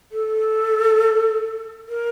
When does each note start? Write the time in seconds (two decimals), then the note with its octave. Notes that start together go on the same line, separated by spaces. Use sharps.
0.12 A4
1.89 A#4